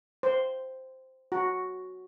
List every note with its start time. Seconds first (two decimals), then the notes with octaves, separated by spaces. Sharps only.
0.23 C5
1.32 F#4